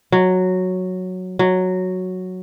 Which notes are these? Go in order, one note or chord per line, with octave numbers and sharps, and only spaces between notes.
F#3
F#3